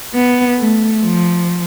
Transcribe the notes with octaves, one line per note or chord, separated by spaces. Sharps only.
B3
A3
F3